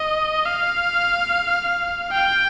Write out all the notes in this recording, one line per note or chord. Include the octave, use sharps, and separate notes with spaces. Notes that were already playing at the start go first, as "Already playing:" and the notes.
Already playing: D#5
F5
G5